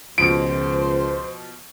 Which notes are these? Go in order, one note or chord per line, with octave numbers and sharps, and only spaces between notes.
C#2 B2 F3 C5 D7